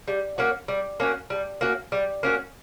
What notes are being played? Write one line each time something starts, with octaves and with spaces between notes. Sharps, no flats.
G3
A#3 C#4 F#4
G3
A#3 C#4 F#4
G3
A#3 C#4 F#4
G3
A#3 C#4 F#4